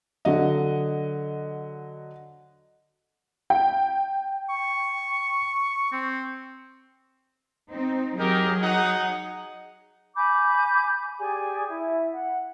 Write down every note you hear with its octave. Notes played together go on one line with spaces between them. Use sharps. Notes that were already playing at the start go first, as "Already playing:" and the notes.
D3 F#3 D#5
G5
C#6
C4
C4 D#4
F#3 D#4 G4 G#4 A#4
D#4 F#5
G#5 B5 D6 G6
G4 G#4 D5 G#5
E4 E5
F#5